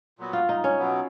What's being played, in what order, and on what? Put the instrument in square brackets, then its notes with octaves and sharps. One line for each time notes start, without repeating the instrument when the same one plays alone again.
[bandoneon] A#2 F#3 B3 F#4
[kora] F4
D#4
C#4
[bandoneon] B2 F#3 B3